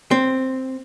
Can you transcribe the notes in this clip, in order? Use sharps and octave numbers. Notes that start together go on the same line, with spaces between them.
C4